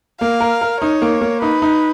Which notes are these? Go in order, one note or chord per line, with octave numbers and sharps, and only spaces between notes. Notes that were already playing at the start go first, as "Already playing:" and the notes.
A#3 F5
A#4
A#4
D#4 C#5
A#3
A#3
D#4 B4
D#4